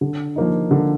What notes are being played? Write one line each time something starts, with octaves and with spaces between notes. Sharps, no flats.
D3
F3 A#3 D#4
D3